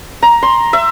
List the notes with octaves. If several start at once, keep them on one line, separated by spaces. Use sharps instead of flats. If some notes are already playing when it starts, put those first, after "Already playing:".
A#5
C6
E5